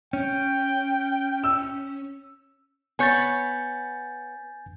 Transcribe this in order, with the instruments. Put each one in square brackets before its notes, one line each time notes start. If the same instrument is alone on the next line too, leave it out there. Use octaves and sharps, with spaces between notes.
[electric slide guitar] C#4 [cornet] G5
[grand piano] E6
[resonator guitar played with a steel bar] B3 C#5 [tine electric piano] G#5 G6 A6